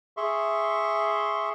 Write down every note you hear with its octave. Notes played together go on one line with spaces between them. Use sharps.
G#4 E5 C6 C#6